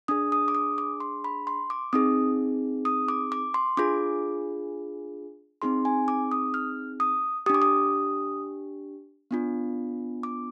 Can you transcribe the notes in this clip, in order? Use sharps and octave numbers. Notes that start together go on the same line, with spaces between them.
D4 G#4 D#6
D#6
D6
D#6
D6
C6
B5
C6
D6
C4 D#4 G#4 D#6
D#6
D6
D6
C6
D4 F4 G#4 D6
C4 D#4 G#4 C6
G#5
D6
D#6
F6
D#6
D4 G4 D6 D#6
D#6
B3 D4 F4
D6